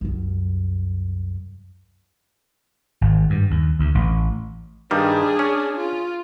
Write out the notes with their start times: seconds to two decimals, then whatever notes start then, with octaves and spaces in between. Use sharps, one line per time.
0.01 C2 F#2
3.01 G#1
3.30 G2
3.51 D#2
3.79 D2
3.95 A1
4.91 G2 D#3 G3 D4 G#4
5.39 C#4
5.78 F4